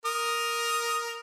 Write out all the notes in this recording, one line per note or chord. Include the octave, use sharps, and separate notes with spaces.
A#4 D#6